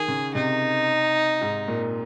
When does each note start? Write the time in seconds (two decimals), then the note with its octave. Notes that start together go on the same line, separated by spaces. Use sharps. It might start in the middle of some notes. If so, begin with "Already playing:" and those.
Already playing: D#3 G#4
0.08 C#3
0.35 C3 D#4
1.41 G#2
1.68 A#2